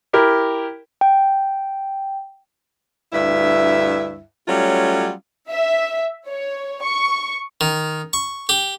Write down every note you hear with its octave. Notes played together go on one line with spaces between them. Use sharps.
E4 G4 A#4
G5
D2 G2 E4 E5
F#3 G3 A3 C#4 F4
E5
C#5
C#6
D#3
C#6
G4